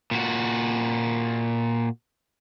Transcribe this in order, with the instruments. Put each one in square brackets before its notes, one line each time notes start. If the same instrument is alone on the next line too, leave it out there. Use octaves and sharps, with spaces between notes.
[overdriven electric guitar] A#2 F#4